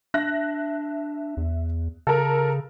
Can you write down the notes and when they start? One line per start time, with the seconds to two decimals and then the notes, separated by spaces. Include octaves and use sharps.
0.14 D4 E5 F#6 A#6
1.37 E2
2.07 C#3 A4 A#4